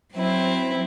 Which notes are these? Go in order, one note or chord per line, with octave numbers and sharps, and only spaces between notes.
F#3 C4 E4